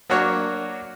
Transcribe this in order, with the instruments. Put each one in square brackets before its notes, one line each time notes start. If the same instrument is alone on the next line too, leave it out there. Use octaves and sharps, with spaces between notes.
[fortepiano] F#3 A#3 D4 F#4 C#5